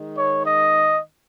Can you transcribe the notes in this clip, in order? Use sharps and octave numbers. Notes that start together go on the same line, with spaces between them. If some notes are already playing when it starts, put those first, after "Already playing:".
Already playing: D#3 G#3
C#5
D#5